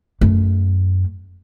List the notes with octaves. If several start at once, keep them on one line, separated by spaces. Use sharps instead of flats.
F#2 A3